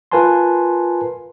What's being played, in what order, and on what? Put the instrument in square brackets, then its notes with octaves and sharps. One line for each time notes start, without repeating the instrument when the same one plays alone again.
[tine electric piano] F4 A#4 B4 G#5 A5 C6